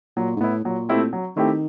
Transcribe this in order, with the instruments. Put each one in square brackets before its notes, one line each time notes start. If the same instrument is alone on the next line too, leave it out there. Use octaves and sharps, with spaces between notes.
[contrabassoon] A#2 [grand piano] F#3
[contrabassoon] G#2
[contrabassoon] A2 [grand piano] B3 E4
[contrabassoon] A#2 [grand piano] F#3
[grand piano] A3 C4 E4 G4
F#3
[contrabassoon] D#3 [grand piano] A3 C4 E4 G4